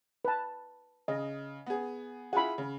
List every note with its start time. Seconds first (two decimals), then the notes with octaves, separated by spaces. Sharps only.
0.25 B4 A5
1.08 C#3 D#5
1.66 B3 G#4
2.33 E4 F4 G#4 F#5 B5
2.58 C#3